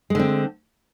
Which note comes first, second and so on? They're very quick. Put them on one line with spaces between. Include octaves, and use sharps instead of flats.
G#3 D3 C4